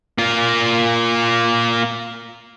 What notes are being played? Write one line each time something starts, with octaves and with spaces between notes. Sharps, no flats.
A#3 F4